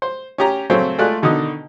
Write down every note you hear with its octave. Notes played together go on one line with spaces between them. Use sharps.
C5
C#4 G4 A#5
C#3 F#3 A3 C4 C#4 C5
G#3 A3 F4 D5 F#6
B2 D3 D#3 D#4 D#5